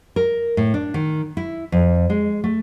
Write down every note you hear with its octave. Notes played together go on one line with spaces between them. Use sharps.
A#4
A2
D4
D#3
E4
F2
G#3
A3